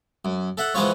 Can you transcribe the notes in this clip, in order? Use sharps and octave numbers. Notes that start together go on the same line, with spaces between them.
F#2
A4 E5 F#5
E3 F3 G#3 B3 F4 C#5